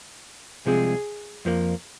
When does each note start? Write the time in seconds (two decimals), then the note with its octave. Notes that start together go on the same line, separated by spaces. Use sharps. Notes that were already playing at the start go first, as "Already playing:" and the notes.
0.66 C2 C3 F3 G#3 C4 G#4
1.45 F2 F3 A#3